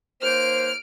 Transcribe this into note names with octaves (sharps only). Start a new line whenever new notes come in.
D#2 A#3 C5 F6 D7